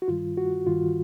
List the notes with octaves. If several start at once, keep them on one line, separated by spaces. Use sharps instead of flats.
F#4
G2 D#3 G3 F4
F#4
G2 D#3 G3 F4